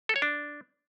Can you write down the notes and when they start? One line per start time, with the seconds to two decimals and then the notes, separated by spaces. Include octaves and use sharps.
0.09 A4
0.16 C#5
0.22 D4